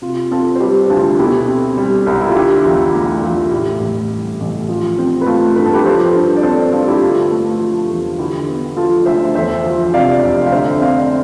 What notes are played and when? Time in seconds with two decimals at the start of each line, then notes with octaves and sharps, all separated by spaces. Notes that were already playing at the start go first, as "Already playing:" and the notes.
0.02 C3 F4
0.31 C4 F4 A4
0.55 C5
0.60 G3 G4 B4
0.89 D2 F4 A4
1.19 B2 E4 G4
1.48 C4
1.77 G3
2.06 C2
2.21 E4
2.28 F4
2.35 D3 E4 G4
2.65 E2 F4
2.94 A3 E4
3.22 E2 F4
3.52 A2 E4 G4
3.81 A1
4.10 G3
4.40 A1
4.69 F3
4.99 C4
5.21 B4
5.27 A3 F4 A4
5.56 G2 B4
5.66 A4
5.74 G4 B4
5.85 F3 A4 C5
6.15 G2
6.36 D5
6.43 C4 A4 C5
6.73 G2 F4 A4
6.87 E4 G4
7.02 D3 F4
7.31 A3
7.60 F3
7.90 E2
8.18 D3 E4 G4
8.48 B3
8.77 F3 F4 A4
9.06 D2 C5 E5
9.35 E2 C5 E5
9.64 F3
9.94 C3 D5 F5
10.23 F1
10.46 F5
10.52 D3 C5 E5
10.81 C4 D5 F5